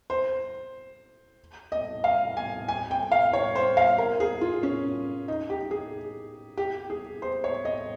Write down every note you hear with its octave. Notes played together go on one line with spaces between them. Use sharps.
C5
D#5
F5
G#5
G#5
G5
F5
C#5
C5
F5
A#4
G#4
F4
C#4
D#4
G4
G#4
G4
G#4
C5
C#5
D#5